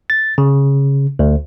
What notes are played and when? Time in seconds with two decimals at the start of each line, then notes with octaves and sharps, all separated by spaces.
0.10 A6
0.38 C#3
1.19 D2